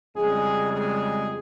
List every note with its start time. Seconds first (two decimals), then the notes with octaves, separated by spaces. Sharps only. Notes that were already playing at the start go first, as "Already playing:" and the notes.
0.16 F2 C#3 G3 G#3 G#4
0.72 G#3 G#4